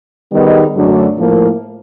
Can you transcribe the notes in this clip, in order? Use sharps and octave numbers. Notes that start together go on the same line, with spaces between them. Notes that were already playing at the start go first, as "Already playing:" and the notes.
D#3 G3 B3 D#4 G#4
F#2 D3 F#3 A3 D4
A2 F3 A#3